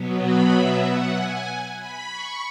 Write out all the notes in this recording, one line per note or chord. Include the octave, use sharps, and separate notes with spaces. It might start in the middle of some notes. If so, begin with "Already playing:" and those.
Already playing: B2 F#3 B3
B5
E5
F#5
G#5
B5
C#6